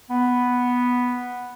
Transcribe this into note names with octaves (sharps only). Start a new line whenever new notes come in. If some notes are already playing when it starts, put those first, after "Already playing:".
B3